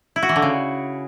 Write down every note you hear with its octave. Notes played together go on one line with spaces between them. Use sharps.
E4
F#4
E3
D3
C#3